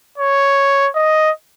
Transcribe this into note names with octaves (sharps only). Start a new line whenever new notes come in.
C#5
D#5